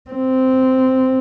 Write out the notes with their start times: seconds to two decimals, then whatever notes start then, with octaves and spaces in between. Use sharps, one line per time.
0.10 C4